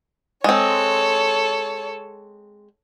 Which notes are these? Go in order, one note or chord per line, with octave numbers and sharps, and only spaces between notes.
G#3 C4 A4 C#5